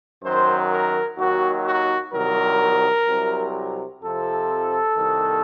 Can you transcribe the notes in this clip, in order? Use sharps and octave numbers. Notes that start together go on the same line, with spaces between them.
F#2 D#3 F#3 C5
A#4
D#2 D#3 F#3 F#4
F#4
C2 C3 D#3 F#3 A#4
C2 C3 F#3
F2 C3 F3 A4
C2 C3 D#3